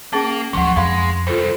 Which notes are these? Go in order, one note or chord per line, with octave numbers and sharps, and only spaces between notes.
A#3 C#4 G#4 A5 A6
D2 G#2 F3 F#3 F#5 C#6
F2 G#3 F5 B5
C2 F4 A4 C5